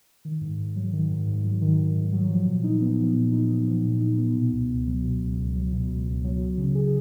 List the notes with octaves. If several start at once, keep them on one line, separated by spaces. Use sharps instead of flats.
D#3
G#2
G#2
F#3
D#3
G#2
G#2
F#3
D#3
G#2
G#2
F#3
F3
A#2
D#4
B3
F3
A#2
D#4
B3
F3
A#2
D#4
B3
B2
C#2
C#2
F#3
B2
C#2
C#2
F#3
B2
C#2
C#2
F#3
F#3
C#3
G#4